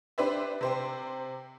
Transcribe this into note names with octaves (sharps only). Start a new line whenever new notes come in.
D4 G4 B4 C5 D5 E5
C3 C5 G5